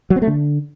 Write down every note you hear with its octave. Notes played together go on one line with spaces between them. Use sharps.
F#3
C4
A3
D3